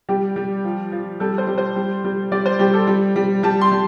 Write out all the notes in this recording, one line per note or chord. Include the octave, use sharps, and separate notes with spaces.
G3 G4
G3
F3
F3
G3 A4
C5
G3
C5
G3
G3
G3 D5
C5
G3 G4
A4
G3
G3
G3 A5
C6
G3